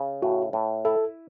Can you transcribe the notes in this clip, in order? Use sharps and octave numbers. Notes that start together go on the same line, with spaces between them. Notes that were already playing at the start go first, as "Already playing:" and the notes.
Already playing: C#3
A2 F#4
A2
E4 A4